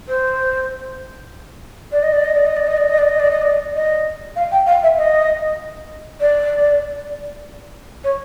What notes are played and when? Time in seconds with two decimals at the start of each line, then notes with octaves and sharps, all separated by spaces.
0.08 C5
1.91 D5
2.02 D#5
2.12 D5
2.24 D#5
2.34 D5
2.45 D#5
2.56 D5
2.66 D#5
2.77 D5
2.88 D#5
2.97 D5
3.08 D#5
3.19 D5
3.31 D#5
3.41 D5
3.75 D#5
4.36 F5
4.51 G5
4.66 F5
4.82 E5
4.97 D#5
6.20 D5
8.03 C#5